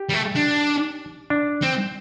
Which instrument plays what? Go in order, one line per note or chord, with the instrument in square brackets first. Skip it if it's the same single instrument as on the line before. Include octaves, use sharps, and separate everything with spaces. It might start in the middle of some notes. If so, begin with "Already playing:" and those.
Already playing: [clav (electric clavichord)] G4
[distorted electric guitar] G3
A3
D4
[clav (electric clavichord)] D4
[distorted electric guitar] C4